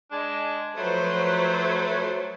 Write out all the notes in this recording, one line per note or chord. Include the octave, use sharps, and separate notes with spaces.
G#3 D4
F3 F#3 A3 B4 C5